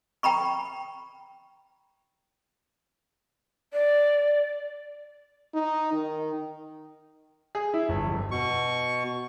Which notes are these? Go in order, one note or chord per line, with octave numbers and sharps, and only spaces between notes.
G5 A#5 B5 C#6
D5
D#4
D#3
G#4
E4
G1
F1
B2 C#6